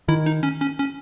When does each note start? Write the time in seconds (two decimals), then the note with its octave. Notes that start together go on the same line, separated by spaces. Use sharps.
0.08 D#3 E4
0.26 D#4
0.43 C#4
0.61 C#4
0.78 C#4